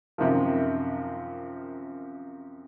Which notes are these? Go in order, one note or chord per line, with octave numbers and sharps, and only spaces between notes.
F#2 C3 D#3 F3